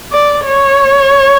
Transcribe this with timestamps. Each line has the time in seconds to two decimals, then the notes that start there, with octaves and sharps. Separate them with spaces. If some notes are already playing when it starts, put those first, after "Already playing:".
0.12 D5
0.45 C#5